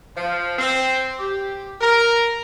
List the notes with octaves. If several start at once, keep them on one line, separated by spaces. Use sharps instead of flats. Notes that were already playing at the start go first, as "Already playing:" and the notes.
F3
C4
G4
A#4